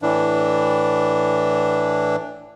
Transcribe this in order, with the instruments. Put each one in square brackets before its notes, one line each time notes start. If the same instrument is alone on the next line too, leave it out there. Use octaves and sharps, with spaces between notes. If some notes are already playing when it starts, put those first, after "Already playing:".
[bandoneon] A2 E3 D4